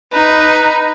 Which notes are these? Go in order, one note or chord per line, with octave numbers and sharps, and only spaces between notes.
D#4 B4